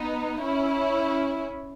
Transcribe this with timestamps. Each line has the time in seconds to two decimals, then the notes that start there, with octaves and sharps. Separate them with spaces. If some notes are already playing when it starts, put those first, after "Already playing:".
Already playing: B3 D#4
0.42 C#4 E4